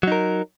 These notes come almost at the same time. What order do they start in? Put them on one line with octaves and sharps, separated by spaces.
F#3 D#4 A#4